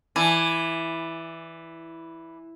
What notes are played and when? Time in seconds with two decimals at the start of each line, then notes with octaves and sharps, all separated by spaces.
0.16 E3 D5 G#5